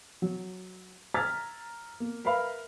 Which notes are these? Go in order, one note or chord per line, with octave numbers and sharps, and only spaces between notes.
F#3
A#5 E6 F6 G#6 A6 B6
A#3
A#4 B4 E5 F5 B5